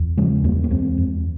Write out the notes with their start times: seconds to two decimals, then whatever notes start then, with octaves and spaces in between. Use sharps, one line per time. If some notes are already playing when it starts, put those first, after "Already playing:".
Already playing: E2
0.17 C#3 F3 G#3
0.44 E2 G3 A#3
0.64 A#3
0.71 E2 G#3 C4
0.98 F2